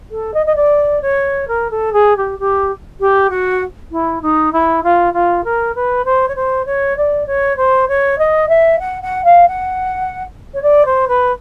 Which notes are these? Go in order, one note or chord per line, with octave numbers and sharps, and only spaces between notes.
A4
D#5
D#5
D5
C#5
A#4
A4
G#4
G4
G4
G4
F#4
E4
D#4
E4
F4
F4
A#4
B4
C5
C#5
C5
C#5
D5
C#5
C5
C#5
D#5
E5
F#5
F#5
F5
F#5
C#5
D5
C5
B4